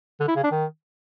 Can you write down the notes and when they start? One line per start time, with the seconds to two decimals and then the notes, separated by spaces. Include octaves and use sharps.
0.20 D3
0.28 E4
0.36 C#3
0.44 D4
0.52 D#3